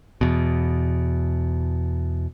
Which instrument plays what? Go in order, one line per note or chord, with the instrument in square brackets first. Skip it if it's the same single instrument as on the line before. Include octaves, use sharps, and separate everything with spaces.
[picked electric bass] E2 B2